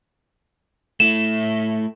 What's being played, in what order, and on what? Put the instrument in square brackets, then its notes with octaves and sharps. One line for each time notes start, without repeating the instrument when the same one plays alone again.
[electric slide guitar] A3 E4 [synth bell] E7